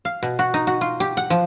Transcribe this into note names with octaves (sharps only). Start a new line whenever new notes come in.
F5
B2
F#4
D#4
F#4
F4
G4
F#5
F3